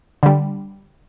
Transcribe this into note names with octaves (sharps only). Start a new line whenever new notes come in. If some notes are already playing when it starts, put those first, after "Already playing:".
D3 G3